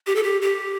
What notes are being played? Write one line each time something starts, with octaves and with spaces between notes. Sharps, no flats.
G4
A4
G4
G4